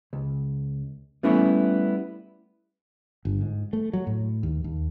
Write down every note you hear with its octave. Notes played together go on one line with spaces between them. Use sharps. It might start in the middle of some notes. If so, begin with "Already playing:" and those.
C#2
G3 A3 B3 C#4 E4 A4
G1
G#2
A3
F#3
A2
D#2
D#2